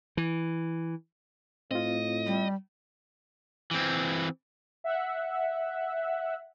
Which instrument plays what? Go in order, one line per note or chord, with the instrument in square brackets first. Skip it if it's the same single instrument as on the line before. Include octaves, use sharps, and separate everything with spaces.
[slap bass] E3
[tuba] A2 [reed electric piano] C4 F4 [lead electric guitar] D#5
[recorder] G3
[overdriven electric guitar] E3 C4
[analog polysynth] E5 F#5